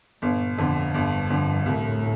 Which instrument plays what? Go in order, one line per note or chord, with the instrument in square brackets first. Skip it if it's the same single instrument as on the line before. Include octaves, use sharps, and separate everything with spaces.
[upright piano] G1 [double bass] A#2
[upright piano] F2 D3
[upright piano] G1 [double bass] G2
[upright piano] F2 D3
[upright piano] C2 [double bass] A2